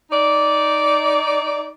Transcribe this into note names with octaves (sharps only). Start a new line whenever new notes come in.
D#4 D5